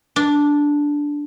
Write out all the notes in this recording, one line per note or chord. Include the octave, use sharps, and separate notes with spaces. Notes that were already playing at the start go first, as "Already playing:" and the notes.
D4